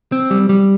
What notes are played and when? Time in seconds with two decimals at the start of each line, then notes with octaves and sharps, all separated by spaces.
0.12 C4
0.30 G3
0.49 G3